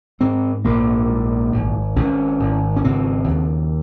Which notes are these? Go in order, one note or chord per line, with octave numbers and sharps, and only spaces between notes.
G#2 C4
A#1 A#3
G#2
G#1
G#1 C#4
G#1
C#4
C#3 C4
D#2